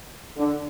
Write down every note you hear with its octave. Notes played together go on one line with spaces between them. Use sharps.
D3